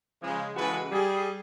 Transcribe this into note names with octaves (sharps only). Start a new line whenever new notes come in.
C#3 F3 G#3
C#3 E3 G#3 F#4 A4 B4
G3 G#4